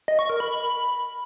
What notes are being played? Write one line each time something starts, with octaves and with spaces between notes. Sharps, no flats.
D#5
C#6
A#4
B5